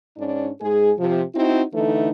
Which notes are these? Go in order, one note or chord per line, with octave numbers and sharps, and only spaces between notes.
G#2 C#4 D4
G#2 G#3 G#4
C3 F3
C4 D#4 E4 F#4
D3 E3 A3 D#4